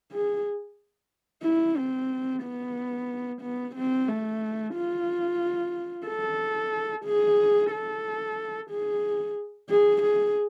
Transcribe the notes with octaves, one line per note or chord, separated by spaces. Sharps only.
G#4
E4
C4
B3
B3
C4
A3
F4
A4
G#4
A4
G#4
G#4
G#4